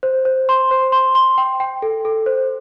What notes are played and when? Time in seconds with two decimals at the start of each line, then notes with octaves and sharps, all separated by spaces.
0.03 C5
0.25 C5
0.49 C6
0.71 C5
0.92 C6
1.15 C6
1.38 G5
1.60 G5
1.82 A4
2.05 A4
2.26 C5